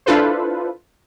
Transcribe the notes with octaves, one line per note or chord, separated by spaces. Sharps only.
D4 E4 F4 A4 B4 C5